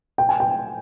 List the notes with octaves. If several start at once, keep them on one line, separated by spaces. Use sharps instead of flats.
G5
G#5
G5